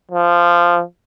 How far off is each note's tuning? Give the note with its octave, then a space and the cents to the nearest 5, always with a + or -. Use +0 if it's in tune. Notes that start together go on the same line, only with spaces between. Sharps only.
F3 -10